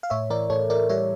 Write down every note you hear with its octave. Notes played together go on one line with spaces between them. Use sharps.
F5
A2 C#5 E5
E3 A#4 D5
A2 A4 C#5
E3 A#4 D5
G3 C#5 E5